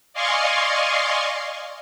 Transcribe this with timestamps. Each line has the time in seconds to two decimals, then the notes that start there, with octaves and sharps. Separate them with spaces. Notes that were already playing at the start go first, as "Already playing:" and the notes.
0.13 D5 D#5 F5 G#5 C6 C#6